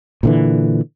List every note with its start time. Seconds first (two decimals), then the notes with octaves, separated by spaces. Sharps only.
0.23 A#2 D3 E3